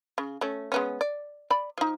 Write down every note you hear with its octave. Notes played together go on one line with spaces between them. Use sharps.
C#3
A3 C#4
G#3 B3 C#4
D5
D5 B5
F3 D#4